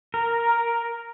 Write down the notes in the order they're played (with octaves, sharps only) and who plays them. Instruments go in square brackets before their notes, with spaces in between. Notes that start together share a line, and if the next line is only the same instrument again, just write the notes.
[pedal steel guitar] A#4